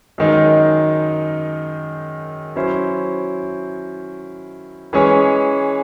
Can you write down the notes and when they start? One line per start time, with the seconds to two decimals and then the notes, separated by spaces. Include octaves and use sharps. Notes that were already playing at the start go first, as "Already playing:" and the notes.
0.18 F#2 D#3 G#3 D#4
2.56 F#3 C#4 E4 C5
4.93 E3 G#3 C#4 G#4 C#5